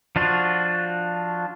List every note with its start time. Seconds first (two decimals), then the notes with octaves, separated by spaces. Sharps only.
0.16 F3 D4 F4 F#4